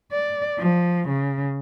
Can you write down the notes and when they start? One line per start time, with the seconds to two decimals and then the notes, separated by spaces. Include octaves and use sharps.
0.12 D5
0.59 F3
1.09 C#3